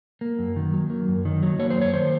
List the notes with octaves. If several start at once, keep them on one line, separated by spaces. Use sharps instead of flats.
A#3
F#2
D#3
F#3
A#3
F#2
D#3
F#3
A#3 C#5
C5
F#2 C#5
D#3 C5